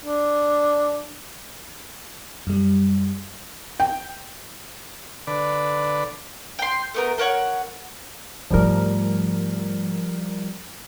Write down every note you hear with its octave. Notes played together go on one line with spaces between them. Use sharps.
D4
F#2 G3
G5
D3 B4 D5
G5 C6
A3 B3 A#4
A4 A#4 C#5 F#5
G#2 F3 G3 A3 A#4